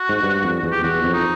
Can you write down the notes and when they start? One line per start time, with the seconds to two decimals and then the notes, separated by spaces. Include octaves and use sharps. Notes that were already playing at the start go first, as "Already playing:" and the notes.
Already playing: F#4
0.09 G#2
0.23 G2
0.44 F2
0.63 E2
0.72 G4
0.83 E2 F#4
1.04 F2
1.14 D#4